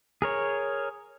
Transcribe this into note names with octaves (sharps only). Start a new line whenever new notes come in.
G#4 A#4 C#5